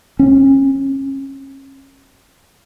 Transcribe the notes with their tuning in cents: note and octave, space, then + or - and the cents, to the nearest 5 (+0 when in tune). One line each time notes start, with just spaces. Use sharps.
C#4 -30